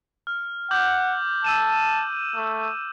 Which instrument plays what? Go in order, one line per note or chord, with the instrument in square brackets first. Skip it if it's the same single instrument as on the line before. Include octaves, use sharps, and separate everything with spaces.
[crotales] F6
[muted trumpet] F#5 [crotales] D6 G6 F#7
[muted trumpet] A5 [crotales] E6 D#7 E7
[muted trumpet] A3